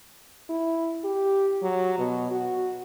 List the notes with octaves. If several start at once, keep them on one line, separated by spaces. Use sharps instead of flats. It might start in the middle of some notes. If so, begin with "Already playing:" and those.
E4
G4
F#3
B2
F#4